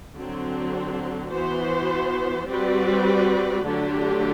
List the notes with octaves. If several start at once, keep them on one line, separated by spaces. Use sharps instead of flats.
D3 F#3 C4
E3 B3 F#4 C5
G3 C4 F#4 B4 D5
D3 F#3 A3 D4 G4